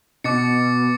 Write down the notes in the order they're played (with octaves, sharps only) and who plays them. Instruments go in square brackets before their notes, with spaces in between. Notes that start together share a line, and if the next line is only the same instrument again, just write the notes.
[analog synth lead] B2 [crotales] D6 A6 C#7